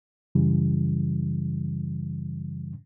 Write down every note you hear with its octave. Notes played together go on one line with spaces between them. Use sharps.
F#2 C#3 E3 G3